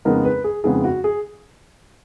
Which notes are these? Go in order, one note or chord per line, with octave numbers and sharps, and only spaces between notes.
F2 C#3 G#3 B3 D#4 A#4
B4
G#4
F2 C#3 G#3 B3 D#4 G#4
F#4
G#4